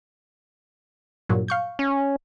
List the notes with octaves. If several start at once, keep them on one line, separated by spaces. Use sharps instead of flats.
G2 A#2 F#3
F5 C#6 G6
C#4